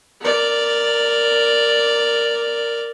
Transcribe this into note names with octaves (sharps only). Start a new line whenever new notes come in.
A#4 D5